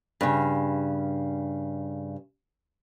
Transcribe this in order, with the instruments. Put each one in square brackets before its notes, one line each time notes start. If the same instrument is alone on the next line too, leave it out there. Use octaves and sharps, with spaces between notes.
[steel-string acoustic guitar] G2 C#3